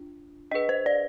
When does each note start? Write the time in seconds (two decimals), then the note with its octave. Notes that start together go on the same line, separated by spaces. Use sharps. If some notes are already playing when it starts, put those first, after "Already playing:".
Already playing: D4 F4
0.51 D4 G#4 B4 D#5
0.69 C5
0.86 D5